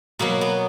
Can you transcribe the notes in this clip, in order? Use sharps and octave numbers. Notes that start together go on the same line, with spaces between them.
B2 F#3 A#3
B3